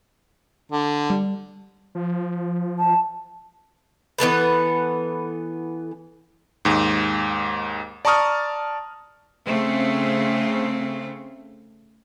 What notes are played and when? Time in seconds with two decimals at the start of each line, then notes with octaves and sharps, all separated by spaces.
0.72 D3
1.10 G3
1.95 F3
2.79 A5
4.18 E3 B3 A4 B4
6.65 D#2 G#2
8.05 D5 A5 A#5 C#6 D#6 F6
9.45 C#3 A3 C4